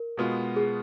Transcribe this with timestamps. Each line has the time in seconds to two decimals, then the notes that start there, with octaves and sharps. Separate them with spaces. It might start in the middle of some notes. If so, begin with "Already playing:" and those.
Already playing: A#4
0.17 B2 G#3 B3 F4
0.56 G#4